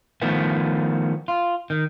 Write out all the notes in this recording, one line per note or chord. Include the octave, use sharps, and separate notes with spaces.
D#3 F3 A3 B3
F4
D#3